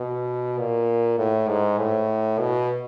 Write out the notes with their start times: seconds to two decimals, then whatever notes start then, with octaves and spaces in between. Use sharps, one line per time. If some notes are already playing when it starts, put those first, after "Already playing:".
Already playing: B2
0.58 A#2
1.18 A2
1.48 G#2
1.78 A2
2.39 B2